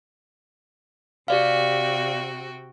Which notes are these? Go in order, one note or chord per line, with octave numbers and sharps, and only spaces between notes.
C3 F#4 G4 D5 F5 G5